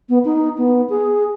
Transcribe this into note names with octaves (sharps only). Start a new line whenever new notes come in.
B3
D#4
B3
G#4